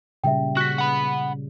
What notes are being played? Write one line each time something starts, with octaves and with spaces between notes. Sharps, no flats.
A#2 C#3 G3 E5 G5
F#4 F#6 B6
F#5 B5